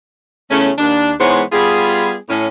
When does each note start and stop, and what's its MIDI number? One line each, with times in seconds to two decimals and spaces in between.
0.50 0.70 40
0.50 0.70 49
0.50 0.70 57
0.50 0.70 61
0.78 1.12 39
0.78 1.12 62
1.19 1.41 44
1.19 1.41 52
1.19 1.41 56
1.19 1.41 59
1.19 1.41 72
1.19 1.41 73
1.52 2.16 55
1.52 2.16 59
1.52 2.16 65
1.52 2.16 68
2.29 2.46 45
2.29 2.46 61